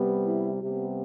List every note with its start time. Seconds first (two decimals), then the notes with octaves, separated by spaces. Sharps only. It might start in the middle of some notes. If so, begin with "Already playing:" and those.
Already playing: C3 G3 B3
0.25 E4
0.60 C3 G3 B3 G4